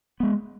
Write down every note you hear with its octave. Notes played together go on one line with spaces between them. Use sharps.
G#3 B3